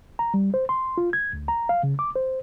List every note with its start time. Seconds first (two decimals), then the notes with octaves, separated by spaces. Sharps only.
0.19 A#5
0.34 G3
0.54 C5
0.69 C6
0.98 F4
1.13 G#6
1.33 D2
1.48 A#5
1.69 F5
1.83 C#3
1.99 D6
2.15 C5